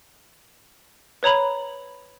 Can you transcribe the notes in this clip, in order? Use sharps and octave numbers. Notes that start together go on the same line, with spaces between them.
B4 C#5 A#5 B5